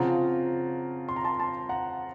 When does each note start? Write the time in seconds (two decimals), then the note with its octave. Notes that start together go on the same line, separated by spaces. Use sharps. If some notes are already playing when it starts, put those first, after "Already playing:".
Already playing: C#3 F3 C4 F4 F#5 A#5
1.09 C6
1.16 A#5
1.24 A5 C6
1.39 A5 C6
1.69 F#5 A#5